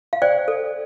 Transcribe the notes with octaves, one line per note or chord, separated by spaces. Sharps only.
F5
C5 D5 G5
A4